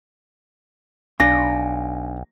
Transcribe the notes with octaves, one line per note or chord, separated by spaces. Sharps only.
B1 D4 F5 G#5 A#6